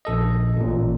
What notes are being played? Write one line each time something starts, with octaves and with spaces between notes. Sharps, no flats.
A#1 A4 D#5
A1 A#2